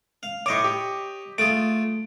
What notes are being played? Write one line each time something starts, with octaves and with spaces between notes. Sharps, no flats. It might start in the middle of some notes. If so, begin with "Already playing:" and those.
F5
A2 C#5 D#5 C#6 D6
G4
A3 F4 G#4 D7